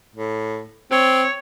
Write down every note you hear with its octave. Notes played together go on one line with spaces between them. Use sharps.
A2
C4 C#5